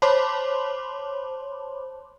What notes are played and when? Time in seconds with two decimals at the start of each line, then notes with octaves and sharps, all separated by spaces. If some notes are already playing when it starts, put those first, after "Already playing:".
0.02 C5 C#5 A5 B5 C6 D6